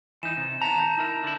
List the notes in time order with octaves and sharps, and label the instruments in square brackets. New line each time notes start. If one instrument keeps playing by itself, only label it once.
[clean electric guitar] E3 D#4 [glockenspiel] E7
[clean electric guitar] C3
[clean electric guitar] D#3 B3 A#5 [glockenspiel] A5 E7
[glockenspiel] A5 G6
[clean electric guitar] D#4 E4 A#4
D3 E4